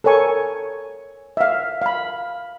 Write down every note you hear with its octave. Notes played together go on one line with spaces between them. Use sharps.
A4 A#4 C#5 G#5 C#6
E5 F5
F5 B5